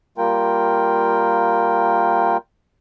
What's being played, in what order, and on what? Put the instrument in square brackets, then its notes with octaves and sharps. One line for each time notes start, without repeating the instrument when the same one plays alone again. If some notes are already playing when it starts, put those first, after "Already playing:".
[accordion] G3 A#3 F4 A#4 G5